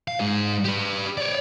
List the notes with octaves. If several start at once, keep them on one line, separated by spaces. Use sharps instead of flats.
F5
G#2 G#4
G4 B4
C#5 D5